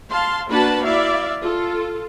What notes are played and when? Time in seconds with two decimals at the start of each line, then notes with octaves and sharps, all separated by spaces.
0.11 F5 A5 C6
0.49 A#3 D4 F#4 B4 A5 B5
0.84 E4 D5 E5 F5
1.42 F4 A4